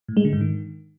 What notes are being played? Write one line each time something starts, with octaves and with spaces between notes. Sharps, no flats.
A2
G#3
D3
G#2
D#3